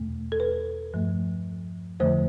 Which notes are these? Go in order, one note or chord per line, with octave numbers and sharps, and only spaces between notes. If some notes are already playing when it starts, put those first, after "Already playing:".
Already playing: E2 B2 A3
A4
B4
G2 F3 A3
F2 D3 F3 A3 C5